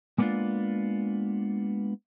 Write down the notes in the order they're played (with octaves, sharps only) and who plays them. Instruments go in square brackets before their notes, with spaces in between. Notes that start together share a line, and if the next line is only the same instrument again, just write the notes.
[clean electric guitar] G#3 A#3 B3 C#4 D4 F4